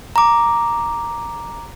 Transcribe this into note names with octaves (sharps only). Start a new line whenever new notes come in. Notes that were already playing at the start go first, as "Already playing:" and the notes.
A#5 D6